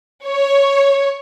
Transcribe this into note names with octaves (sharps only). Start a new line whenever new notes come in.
C#5